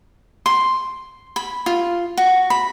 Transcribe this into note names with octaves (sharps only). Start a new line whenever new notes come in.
C6
B5
F4
F#4
B5